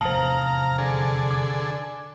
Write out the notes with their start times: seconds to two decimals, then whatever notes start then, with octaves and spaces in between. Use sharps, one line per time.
0.01 F1 E2 A2 C5 F5 A5 A#5
0.78 D3 G#4 A4
1.31 D6